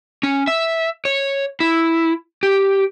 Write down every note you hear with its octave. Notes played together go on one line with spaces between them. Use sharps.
C#4
E5
C#5
E4
G4